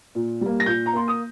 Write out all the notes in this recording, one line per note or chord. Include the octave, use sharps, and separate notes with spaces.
A#2
G3 A#3
A#6
A#2 G6
A#5
A#3 C6
D#6